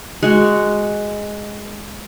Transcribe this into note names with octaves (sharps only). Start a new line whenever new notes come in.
G#3 F#4